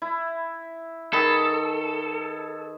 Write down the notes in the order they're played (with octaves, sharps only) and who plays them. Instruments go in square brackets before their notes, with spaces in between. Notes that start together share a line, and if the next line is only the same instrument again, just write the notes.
[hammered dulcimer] E4
[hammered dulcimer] D#3 G#4 B4 [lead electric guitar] A4